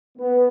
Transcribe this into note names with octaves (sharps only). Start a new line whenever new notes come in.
B3